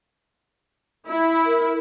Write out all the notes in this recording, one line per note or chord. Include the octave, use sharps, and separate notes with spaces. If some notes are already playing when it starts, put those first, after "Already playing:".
E4
A#4